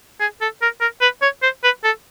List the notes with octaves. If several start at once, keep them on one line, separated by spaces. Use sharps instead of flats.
G#4
A4
A#4
A#4
B4
C#5
C5
B4
A4